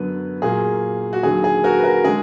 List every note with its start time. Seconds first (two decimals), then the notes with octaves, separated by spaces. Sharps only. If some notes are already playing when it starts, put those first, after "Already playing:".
Already playing: F#2 D3 F#3 B3 B4
0.42 A#2 F#3 A#3 G#4
1.13 F#4
1.23 D#2 D3 F#3 G#4
1.44 G#4
1.64 F#4 A#4
1.79 B4
1.84 F#4 A#4
2.04 D3 G#3 G#4